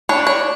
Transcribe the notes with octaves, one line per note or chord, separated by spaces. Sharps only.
D4 C#5
C#5